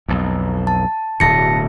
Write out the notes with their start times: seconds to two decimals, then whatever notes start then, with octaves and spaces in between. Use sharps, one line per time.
0.08 B1 F2
0.67 A5
1.20 D1 D2 B2 A5 A#6 C#7